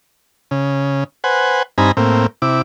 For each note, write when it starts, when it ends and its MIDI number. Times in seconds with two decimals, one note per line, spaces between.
0.51 1.04 49
1.24 1.63 71
1.24 1.63 72
1.24 1.63 78
1.24 1.63 80
1.78 1.92 43
1.78 1.92 60
1.78 1.92 63
1.78 1.92 80
1.78 1.92 82
1.78 1.92 83
1.97 2.26 45
1.97 2.26 58
1.97 2.26 60
2.42 2.62 48
2.42 2.62 64
2.42 2.62 86